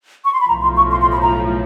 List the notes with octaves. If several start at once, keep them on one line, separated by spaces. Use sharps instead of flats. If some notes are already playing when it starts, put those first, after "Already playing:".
C#6
C6
B5
B1 A2 F3 A#5
C6
C#6
C6
C6
B5
A#5